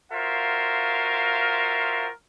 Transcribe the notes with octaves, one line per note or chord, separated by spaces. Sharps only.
F4 F#4 A#4 C5 E5 F5